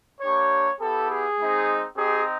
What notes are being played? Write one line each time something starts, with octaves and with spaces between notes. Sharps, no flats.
A#3 D4 G4 C#5
B3 E4 G4 A4
G#4
G#3 C4 D#4
C4 D#4 G4 G#4